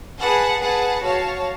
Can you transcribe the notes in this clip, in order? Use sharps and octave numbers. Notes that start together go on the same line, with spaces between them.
G#4 B4 F#5 A5
G#4 B4 F#5 A5
F#4 C#5 F5 A5